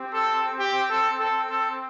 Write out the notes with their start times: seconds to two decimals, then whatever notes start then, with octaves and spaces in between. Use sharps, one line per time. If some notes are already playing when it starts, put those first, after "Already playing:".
Already playing: C4 G4
0.14 A4
0.59 G4
0.90 A4
1.20 A4
1.50 A4